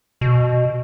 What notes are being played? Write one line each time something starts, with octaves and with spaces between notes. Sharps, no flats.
B2